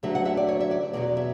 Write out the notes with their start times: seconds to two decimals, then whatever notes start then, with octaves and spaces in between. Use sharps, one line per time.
0.03 D2 D3 F#3 E5
0.15 F#5
0.25 E5
0.37 D5
0.49 C#5
0.60 E5
0.71 D5
0.93 E2 B2 F#3 D5
1.17 E5